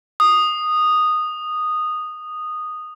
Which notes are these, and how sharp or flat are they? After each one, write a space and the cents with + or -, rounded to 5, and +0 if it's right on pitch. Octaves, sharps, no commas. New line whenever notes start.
D#6 -10